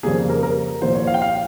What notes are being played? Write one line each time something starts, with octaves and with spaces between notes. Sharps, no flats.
F2 C#3 G3 A#3 G#4
A#4
A#4
C2 A#2 F3 C5
C#5
F5
G5
F5